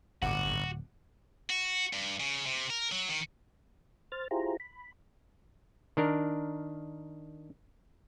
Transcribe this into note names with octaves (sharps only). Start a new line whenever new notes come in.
D1 G1 F#4 F#5 D6
F#4
G2
C#3
C3
A#4
F#3
D#3
C5 F6 A6
E4 F4 G4 G#4 C5 A#5
B5
D#3 D4 A#4